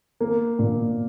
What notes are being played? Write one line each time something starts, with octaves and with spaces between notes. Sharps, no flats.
A#3
A#2